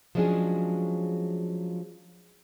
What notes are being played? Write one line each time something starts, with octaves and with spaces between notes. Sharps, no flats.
F3 F#3 G#3 C#4 D4 G#4